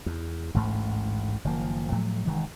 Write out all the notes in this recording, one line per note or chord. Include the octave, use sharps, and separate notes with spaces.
E2
A1 D2 G#2 A3
F#1 D#3 F3 A#3
A2 F3 F#3 A3
F1 D#3 E3 G#3